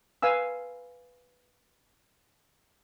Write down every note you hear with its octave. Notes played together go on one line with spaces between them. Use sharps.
B4 F5 G#5 E6